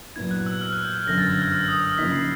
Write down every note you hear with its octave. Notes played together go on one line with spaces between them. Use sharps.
A#2 F#3 B3 E4 G#6
F#6
E6
F6
F#6
G6
F6
G1 F#2 D3 A#6
A6
G#6
F6
E6
D#6
F6
C#3 F3 A#3 D#4 B6
C7